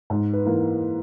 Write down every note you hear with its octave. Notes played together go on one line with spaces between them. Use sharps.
G#2
B4
E3 A#3